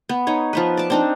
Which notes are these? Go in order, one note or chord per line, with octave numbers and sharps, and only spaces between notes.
B3
D#4 C#5
F3 B3 B4
D5 A5
C4 D4 D#4